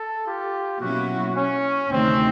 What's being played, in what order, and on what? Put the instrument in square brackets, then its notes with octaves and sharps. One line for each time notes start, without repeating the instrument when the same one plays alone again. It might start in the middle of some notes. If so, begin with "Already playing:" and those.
Already playing: [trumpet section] A4
F4 G4
[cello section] B2 F#3 A#3 C#4 E4 [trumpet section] F#4
[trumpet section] C#4
[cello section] D2 C3 D#3 [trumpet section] C4